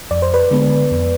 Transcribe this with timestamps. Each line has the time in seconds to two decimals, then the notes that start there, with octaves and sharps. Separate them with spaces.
0.11 F2 D5
0.22 C5
0.34 B4 D5
0.51 D3 G#3 B3
0.91 F2